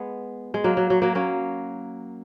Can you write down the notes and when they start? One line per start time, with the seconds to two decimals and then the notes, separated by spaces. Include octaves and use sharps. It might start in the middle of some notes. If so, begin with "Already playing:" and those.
Already playing: G#3 B3
0.54 G#3
0.64 F#3 A#3
0.77 F#3
0.90 F#3
1.02 F#3 A#3
1.15 A#3 C#4